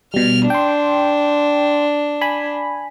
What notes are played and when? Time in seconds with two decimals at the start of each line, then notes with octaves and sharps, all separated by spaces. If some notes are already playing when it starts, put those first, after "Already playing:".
0.14 B2 G3 F6
0.50 D4 G5 C6
2.21 G#5 B5